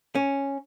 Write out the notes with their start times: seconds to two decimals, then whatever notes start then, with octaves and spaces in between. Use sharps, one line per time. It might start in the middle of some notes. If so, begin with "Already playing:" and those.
0.15 C#4